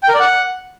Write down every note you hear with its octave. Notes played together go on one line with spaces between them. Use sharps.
G5
A#4
D5
F#5